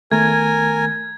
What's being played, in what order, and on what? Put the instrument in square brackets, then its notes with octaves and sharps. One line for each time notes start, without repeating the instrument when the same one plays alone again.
[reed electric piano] D#3 A3 B3 [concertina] A#4 G#5 [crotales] G#6